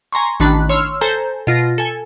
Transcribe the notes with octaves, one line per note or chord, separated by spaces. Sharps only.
G#5 A#5 C6 C#6
A1 D#3 D4 A5 B5 F#6
C#5 C6 E6 F6
A4 C5 G#5 A#5 G6
B2 F4 A#6
A4 G#5